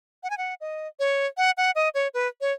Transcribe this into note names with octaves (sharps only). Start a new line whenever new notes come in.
F#5
G#5
F#5
D#5
C#5
F#5
F#5
D#5
C#5
B4
C#5